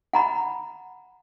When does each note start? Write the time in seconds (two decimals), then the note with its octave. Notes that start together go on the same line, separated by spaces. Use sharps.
0.13 F#5 A#5 B5